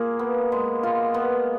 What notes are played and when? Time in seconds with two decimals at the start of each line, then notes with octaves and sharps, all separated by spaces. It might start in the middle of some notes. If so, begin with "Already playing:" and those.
Already playing: A#3 F4 G#4
0.19 B3
0.52 G#3
0.83 F4
1.14 B3